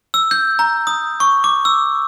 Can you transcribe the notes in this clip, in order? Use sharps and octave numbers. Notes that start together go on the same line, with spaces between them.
E6
G6
A#5
D#6
C#6
D6
E6